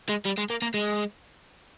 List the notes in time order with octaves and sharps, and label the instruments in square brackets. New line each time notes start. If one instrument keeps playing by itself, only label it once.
[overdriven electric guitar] G#3
G3
G#3
A#3
A#3
G#3